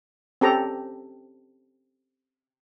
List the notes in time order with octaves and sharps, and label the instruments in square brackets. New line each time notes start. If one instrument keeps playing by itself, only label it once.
[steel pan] C4 C#4 G4 A4 G5 A#5